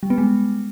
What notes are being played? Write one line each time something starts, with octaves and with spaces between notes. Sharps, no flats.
G3
B3
G#3